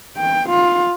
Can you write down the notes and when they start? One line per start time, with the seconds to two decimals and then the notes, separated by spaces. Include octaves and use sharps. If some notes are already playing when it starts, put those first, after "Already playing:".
0.17 G5
0.50 F4